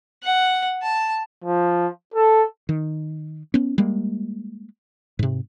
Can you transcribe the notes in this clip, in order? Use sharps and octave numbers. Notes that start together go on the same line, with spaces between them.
F#5
A5
F3
A4
D#3
B3 C#4
G3 G#3 A#3
G#2 C3